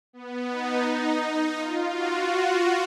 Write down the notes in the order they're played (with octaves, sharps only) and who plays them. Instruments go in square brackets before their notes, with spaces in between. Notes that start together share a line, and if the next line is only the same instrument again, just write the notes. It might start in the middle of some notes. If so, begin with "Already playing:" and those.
[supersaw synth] B3
D#4
F4
F#4